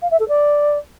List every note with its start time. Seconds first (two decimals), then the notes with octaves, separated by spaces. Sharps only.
0.02 F5
0.11 E5
0.20 A4
0.29 D5